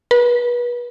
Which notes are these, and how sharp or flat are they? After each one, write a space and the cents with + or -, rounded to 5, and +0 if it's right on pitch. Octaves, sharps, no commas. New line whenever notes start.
B4 -30